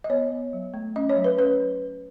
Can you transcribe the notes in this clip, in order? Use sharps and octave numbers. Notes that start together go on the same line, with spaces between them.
D#5
B3 C#5
B3
F#3
A3
C#4 D#5
C#5
F#3
B4
C#4 B4